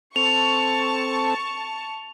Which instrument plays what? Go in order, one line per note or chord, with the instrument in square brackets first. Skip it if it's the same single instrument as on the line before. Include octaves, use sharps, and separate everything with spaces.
[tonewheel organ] C4 A4 [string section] A5 C#6 [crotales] F7